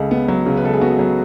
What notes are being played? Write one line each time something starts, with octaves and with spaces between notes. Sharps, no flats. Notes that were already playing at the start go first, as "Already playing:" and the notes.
Already playing: C#2 C#3 A4
B3
F#3
C#3
B4
C#2 A4
G#4
B3 F#4
F#3